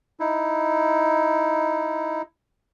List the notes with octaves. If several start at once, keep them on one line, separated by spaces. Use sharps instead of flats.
D#4 E4